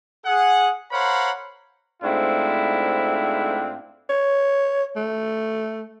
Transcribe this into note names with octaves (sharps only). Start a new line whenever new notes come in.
G#4 F#5
A#4 C5 C#5 F5 F#5 B5
G#2 A3 C4 D4 E4 F4
C#5
A3